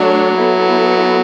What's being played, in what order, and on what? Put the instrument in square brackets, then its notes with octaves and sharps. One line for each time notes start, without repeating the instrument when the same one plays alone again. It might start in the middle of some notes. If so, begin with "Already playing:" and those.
Already playing: [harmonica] F#3 [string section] A3 D4 A4 C#5
[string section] B3 E4 A4